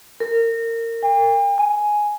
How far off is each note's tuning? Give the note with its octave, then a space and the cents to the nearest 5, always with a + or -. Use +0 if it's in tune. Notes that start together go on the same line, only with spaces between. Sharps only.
A#4 -25
G5 +45
G#5 +5